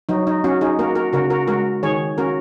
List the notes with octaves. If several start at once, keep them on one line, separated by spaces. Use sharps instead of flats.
F#3 D#4
D#4
C#4 F#4
D#4 G#4
A#3 F#4 A#4
F#4 A#4
C#3 F#4 A#4
F#4 A#4
G#3 F#4 A#4
D#3 G#4 C#5
C#4 F#4 A#4